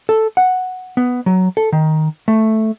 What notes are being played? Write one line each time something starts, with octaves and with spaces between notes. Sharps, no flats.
A4
F#5
B3
F#3
A4
D#3
A3